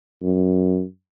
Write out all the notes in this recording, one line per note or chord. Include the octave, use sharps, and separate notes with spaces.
F#2